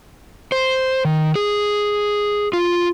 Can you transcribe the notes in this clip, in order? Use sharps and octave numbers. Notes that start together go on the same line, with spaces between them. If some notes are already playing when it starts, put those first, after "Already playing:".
C5
D#3
G#4
F4